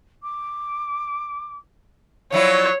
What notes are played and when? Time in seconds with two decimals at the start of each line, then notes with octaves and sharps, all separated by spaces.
0.23 D6
2.32 F3 F#3 E4 C#5 D5